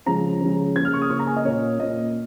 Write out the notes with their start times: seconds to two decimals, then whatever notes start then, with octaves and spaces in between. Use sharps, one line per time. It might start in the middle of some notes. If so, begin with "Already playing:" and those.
0.06 C#3 F3 G#3 C#4 A#5
0.41 C#3 F3 G#3 C#4
0.76 C#3 A#3 C#4 G#6
0.85 F6
0.93 C#6
1.02 D#6
1.10 C#3 A#3 C#4 C#6
1.19 A#5
1.27 G#5
1.37 D#5
1.45 A#2 A#3 C#4 C#5
1.79 A#2 A#3 C#4 D#5